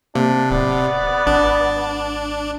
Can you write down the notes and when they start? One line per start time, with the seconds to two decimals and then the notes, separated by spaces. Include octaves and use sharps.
0.15 C3 A#3 D4
0.51 D1 B3 D5
1.27 G#1 D4